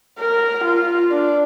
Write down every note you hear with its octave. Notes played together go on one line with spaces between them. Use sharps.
A#4
F4
D4